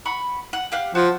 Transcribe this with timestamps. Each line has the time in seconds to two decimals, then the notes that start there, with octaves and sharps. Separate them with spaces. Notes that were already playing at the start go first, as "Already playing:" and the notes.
0.05 F#5 B5 C#6
0.53 F#5
0.72 G4 F5 F#5
0.95 F3 F#4